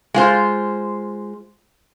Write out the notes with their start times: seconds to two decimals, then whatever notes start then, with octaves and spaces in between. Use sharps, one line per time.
0.14 G#3 F4 C5